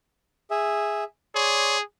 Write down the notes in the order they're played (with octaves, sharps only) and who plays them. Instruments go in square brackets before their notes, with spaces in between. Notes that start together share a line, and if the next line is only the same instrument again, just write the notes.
[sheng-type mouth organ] G#4 E5
[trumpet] G#4 [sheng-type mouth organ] C#5 D5 C6